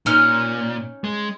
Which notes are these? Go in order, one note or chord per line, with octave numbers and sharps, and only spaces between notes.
A#2 C#4 D#4 F6
G#3